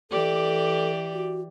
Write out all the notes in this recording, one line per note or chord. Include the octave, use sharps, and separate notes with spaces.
E3 G4 A4 D5
F#4